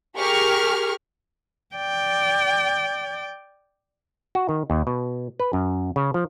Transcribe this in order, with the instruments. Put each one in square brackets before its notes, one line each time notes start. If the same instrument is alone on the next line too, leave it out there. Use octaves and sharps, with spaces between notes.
[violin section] G4 G#4 A#4 C#6 F6
[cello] D5 G5
[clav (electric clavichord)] F#4
D#3
D#2
B2
B4
F#2
C#3
F3